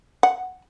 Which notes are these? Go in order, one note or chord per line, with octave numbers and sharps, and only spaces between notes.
F#5